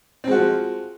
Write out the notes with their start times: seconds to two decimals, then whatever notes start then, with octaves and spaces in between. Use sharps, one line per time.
0.24 C4
0.27 G#3
0.31 F#4
0.35 F3